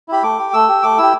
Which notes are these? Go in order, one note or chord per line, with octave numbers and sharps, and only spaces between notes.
E4 G4 B5
A3 D6
G4
A3 E6
G4
A3 D6
E4 G4 E6